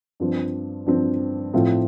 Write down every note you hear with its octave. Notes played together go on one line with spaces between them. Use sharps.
G2 F3 C4
G2 F3 C4
A2 F3 C4 F4